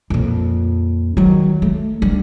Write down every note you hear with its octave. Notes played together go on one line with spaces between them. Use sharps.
F2 A#2
D#3 F#3
A3
D3 G3